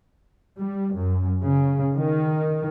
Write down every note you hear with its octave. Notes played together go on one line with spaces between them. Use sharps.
G3
F#2
C#3
D#3